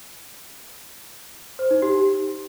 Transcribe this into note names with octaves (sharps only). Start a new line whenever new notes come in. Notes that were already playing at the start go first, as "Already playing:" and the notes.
C5
D#4
G4
G4